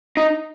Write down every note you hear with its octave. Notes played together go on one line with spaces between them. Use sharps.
D#4